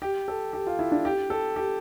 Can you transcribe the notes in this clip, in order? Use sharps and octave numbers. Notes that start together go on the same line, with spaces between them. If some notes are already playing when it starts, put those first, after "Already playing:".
G4
A4
G4
F4
E4
D4
G4
A4
G4